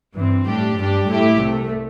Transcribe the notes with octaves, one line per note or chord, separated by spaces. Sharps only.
G2 E3 C4
A2 G3 D4 G4
G2 G3 D4 G4
A2 A3 E4 G4
C2 C3 A3